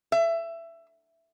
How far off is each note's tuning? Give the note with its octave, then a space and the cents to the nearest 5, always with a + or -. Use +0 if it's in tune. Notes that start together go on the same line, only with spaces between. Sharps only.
E5 +20